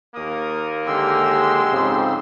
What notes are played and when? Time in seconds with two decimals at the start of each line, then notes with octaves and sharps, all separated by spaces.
0.15 D#2 A#3 A#4 D#6
0.87 D3 G#3 G4 C6 E6
1.71 F2 G#2 C#3